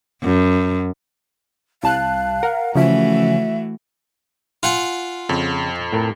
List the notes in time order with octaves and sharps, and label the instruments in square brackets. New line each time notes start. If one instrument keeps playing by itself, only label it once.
[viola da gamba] F#2
[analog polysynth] C2 A5 F#6 [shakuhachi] F5
[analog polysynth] A#4 F#5
[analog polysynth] C#3 F3 C#4 [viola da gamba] E3 A3 F#4 [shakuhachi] E5
[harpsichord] F4 F#5 G#5
[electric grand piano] F2 [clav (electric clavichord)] C#3
[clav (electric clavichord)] A2 A#4